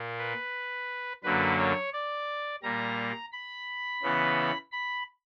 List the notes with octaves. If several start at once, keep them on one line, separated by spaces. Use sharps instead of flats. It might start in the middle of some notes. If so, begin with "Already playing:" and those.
Already playing: A#2 A#3
B4
F#2 D3 F#3 A#3 B4
C#5
D5
A#2 G3 A#3 A#5
B5
C#3 E3 B3
B5